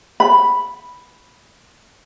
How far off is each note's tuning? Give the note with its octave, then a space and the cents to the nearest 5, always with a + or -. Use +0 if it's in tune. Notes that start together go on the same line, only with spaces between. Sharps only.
B5 -5